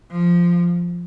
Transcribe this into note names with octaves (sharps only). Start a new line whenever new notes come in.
F3